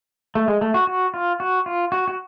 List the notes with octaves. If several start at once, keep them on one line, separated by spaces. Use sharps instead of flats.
A3
G#3
A3
F#4
F#4
F4
F#4
F4
F#4
F#4